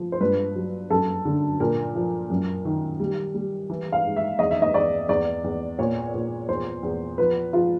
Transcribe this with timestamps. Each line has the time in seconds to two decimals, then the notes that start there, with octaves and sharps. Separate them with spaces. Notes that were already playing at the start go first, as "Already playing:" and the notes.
Already playing: F3
0.12 C5
0.21 G2 B4
0.56 F#3
0.90 F#2 A4
1.25 D3
1.60 A#2 A#4
1.95 F3
2.30 F#2
2.65 D#3
3.00 G3
3.34 G3
3.70 E3
3.92 F5
4.05 G#2
4.16 E5
4.39 E2 D#5
4.51 E5
4.62 D#5
4.74 E2 D5
5.09 E2 D5
5.44 E2
5.79 A#2 C#5
6.14 A#2
6.49 E2 C5
6.83 E2
7.18 F3 B4
7.53 F3 F4